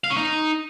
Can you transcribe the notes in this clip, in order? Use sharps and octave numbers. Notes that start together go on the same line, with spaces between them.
F5
C#4
D#4